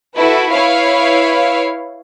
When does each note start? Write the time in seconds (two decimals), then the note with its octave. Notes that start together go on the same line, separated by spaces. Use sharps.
0.16 E4 F#4 A4 B4
0.50 E4 B4 C#5 F5